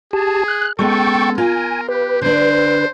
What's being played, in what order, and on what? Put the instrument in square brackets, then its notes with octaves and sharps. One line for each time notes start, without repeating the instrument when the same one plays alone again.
[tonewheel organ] G4 A5 [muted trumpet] G#4
[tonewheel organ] F#6
[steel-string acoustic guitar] G#3 B3 C#4 [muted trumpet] A4 [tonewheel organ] G5 C#6
[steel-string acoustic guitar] F4 [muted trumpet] A#4 [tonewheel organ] G#5
[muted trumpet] G4 [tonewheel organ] B4
[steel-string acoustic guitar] D3 D4 [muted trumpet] C5